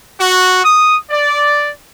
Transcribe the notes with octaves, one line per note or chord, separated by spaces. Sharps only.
F#4
D#6
D5